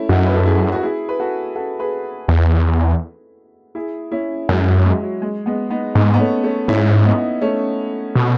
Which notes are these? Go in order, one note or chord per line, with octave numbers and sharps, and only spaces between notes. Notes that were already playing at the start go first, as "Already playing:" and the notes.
Already playing: A3 C#4 E4
F#2 D#4 F#4
B4
A4
E4 G#4
F#4
E4 G#4
B4
F#4 A4
F#4 A4
G#4 B4
E2
E4 G#4
C#4 E4
F#2 G#3
F#3
G#3
F#3
G#3
G#3 B3
B3 D#4
G#2 B3 D#4
B3
A3 C#4
A3 C#4
G#2 C#4 E4
B3 D#4
A3 C#4
B2